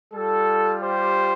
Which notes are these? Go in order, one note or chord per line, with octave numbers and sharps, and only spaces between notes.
G3 F4 A4
G4 C5